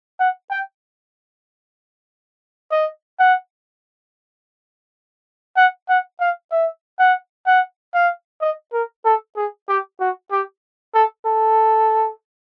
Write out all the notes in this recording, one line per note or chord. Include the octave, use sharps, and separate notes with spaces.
F#5
G5
D#5
F#5
F#5
F#5
F5
E5
F#5
F#5
F5
D#5
A#4
A4
G#4
G4
F#4
G4
A4
A4